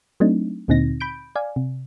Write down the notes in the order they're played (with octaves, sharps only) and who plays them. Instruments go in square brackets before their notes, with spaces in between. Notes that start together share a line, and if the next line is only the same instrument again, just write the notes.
[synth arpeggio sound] F#3 A3 C4 D4 D#4
D2 A#2 D3 C4 D#4 A#6
B5 G6 D7
D5 F5 G#5
C3